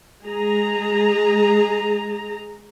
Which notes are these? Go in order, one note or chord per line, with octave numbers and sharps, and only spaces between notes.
G#3 G#4 A#5